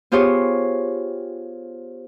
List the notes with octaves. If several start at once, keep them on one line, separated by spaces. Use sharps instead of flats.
B3 F4 G4 G#4 C5 C#5